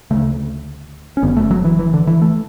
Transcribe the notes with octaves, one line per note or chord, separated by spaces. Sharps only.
D2 C#3 A3
C#4
F#1 F#2 D3 B3
A3
F#3
E3
E3
D3
E3
A3